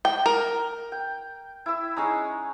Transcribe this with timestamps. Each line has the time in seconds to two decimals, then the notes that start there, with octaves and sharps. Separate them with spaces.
0.05 G5
0.26 A#4
0.92 G5
1.66 E4 E6
1.97 G#3 C#4 D#4